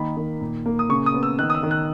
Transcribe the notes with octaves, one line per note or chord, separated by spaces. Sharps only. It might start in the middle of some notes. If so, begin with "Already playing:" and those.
Already playing: D#3 A#3 B5
D#3
A#2
A#3
D#6
C#3 C#6
D#6
B3
E6
D#3 F#6
D#6
E6
D#3
F#6